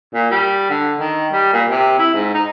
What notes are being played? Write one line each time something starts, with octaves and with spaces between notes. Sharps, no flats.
A#2
G3
D3
D#3
G3
A#2
C3
E4
G#2
D#4